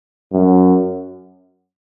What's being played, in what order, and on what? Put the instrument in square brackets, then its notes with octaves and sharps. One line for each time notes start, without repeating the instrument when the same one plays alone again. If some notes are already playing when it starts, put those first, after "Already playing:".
[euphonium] F#2